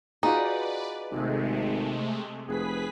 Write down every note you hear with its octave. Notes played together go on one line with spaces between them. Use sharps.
D#4 F4 F#4 G#4 B4 D5
G#1 C3 G#3 A3
F1 G#4 B4 B6